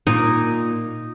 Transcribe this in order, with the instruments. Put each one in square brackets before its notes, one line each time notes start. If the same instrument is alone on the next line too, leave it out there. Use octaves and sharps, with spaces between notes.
[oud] A#2 [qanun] D#4